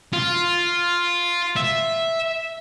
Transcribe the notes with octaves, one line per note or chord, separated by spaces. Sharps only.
F4
E5